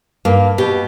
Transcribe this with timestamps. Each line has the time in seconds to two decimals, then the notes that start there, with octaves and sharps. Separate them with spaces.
0.25 G2 A#3
0.58 B2 G4